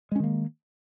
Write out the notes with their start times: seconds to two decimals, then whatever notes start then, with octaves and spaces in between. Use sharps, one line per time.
0.12 G#3
0.16 C#4
0.20 D#3
0.24 A#3